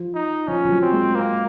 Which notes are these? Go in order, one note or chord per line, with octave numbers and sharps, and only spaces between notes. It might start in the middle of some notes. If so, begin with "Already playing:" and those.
Already playing: F3
D#4
F3 C#4
F3
F#3
C4
G#3
A#3